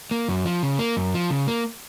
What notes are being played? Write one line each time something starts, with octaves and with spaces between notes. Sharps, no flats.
A#3
F#2
F3
C#3
A#3
F#2
F3
C#3
A#3